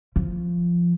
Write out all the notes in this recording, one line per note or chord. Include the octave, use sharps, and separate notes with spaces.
F3